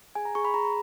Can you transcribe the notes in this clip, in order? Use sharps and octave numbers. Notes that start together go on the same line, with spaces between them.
G#4 G#5
A#5
G#4 C#6
B5
G#4 A#5
A#5